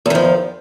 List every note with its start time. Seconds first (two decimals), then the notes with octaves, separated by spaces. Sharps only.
0.06 E2
0.10 D#3
0.15 F3